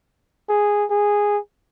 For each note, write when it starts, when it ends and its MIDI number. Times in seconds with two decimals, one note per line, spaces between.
0.49 0.85 68
0.90 1.39 68